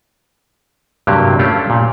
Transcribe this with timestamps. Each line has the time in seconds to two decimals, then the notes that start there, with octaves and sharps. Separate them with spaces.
1.07 G2 C3 F#3 A#3 G4
1.39 A3 C#4 F4 G4
1.70 A#2